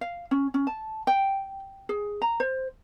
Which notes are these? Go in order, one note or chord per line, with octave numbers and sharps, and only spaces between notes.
F5
C#4
C#4
A5
G5
G#4
A#5
C5